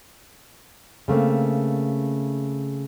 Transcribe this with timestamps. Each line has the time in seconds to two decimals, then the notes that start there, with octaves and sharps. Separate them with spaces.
1.08 C#3 A3 A#3 C4